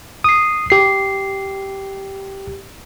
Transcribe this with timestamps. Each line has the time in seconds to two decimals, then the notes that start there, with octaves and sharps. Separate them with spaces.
0.24 D#6 C7
0.70 G4 C7